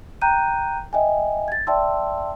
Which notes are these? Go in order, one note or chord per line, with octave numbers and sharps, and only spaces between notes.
G5 A#5 F#6 G6 D#7
D#5 E5 G5 G#5
G#6 A6
D5 E5 G5 A5 C6 E6